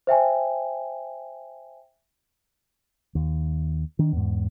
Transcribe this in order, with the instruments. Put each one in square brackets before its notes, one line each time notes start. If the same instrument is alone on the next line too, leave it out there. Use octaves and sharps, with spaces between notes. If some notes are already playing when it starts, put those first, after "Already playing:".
[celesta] C5 E5 G5 G#5
[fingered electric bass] D#2
D#3 D4
E2 G#2